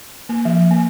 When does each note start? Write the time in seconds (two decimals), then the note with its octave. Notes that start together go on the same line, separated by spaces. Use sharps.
0.29 A#3
0.45 F3
0.71 A#3